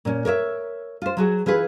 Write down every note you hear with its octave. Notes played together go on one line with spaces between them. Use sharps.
A#2 C#4
A#4 C#5 D5 E5
F4 C5
F#3 F#4 G#4
E3 F4 G#4 B4